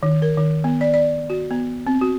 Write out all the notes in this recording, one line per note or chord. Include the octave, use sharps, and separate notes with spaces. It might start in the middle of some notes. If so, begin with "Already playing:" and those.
D#3
A#4
D#3
B3
D5
D5
F#4
B3
C4
F#4